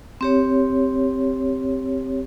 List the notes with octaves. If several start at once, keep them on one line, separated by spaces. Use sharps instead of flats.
C4 G4 C#5